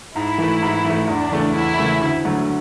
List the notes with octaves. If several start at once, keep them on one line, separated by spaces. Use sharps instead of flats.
G#2 E4
E3 A3
G#2
E3
A3
E2 D4
C#3 E3 A3
E2 E4
C#3 E3 A3
D2
D3 F#3 A3